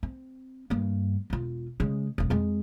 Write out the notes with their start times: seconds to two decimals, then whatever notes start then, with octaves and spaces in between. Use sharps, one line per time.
0.03 C4
0.70 G2 A#3
1.30 E1 F4
1.80 C#3 G#3
2.18 E1 B1
2.30 F2 G#3